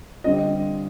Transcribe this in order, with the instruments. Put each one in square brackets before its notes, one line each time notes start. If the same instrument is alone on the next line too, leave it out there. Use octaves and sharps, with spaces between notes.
[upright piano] D3 G3 C4 F4 D#5